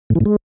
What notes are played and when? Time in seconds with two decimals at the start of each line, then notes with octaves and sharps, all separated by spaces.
0.10 A2
0.15 E3
0.20 A2
0.25 G#3